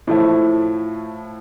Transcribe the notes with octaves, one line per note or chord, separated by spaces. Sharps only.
A2 F3 A3 E4